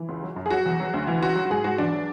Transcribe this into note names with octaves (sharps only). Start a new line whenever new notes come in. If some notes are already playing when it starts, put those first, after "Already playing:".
Already playing: E3
C#2
F#3
F#2
G#4
F#3 F#4
E2
F#3
D2
E3
C#2 F#4
F#3
F#4
G#2 G#4
G#2 F#4
E2 D4
F#3